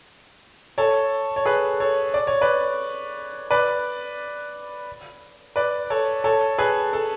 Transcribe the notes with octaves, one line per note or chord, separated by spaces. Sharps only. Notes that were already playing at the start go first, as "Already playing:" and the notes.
A4 C#5
C#5
G#4 B4
A4 C#5
D5
C#5
B4 D5
B4 D5
B4 D5
A4 C#5
A4 C#5
G#4 B4
A4